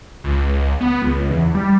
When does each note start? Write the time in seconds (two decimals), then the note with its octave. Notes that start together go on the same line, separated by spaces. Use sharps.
0.24 C#2
0.81 B3
1.02 C#2
1.30 E2
1.55 G3